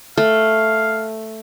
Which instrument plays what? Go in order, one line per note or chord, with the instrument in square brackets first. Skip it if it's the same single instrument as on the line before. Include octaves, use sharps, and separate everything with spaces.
[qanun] A3 [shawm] F5